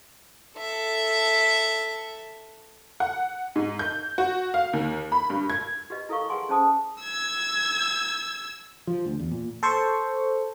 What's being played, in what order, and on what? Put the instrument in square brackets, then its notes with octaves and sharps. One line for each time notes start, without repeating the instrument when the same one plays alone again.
[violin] A4 E5
[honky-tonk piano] F#5
G#2
G6
F#4
F5
D#2
B5
G2
G#6
[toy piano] F#4 G4 B4 D#5
E4 A4 A#4 F5 C#6
G#4 B4 F#5 G#5 C6 D6
C#4 G#4 C5 A5 D6 D#6
[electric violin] E6 [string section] G#6
[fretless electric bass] F3
D2
E2
A#2
[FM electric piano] A4 C5 C#6